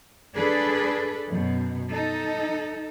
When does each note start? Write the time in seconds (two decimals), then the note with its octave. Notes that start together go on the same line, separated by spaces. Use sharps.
0.35 D4 G#4 A4 B4 D5
1.28 F#2 B2
1.90 D#4 A4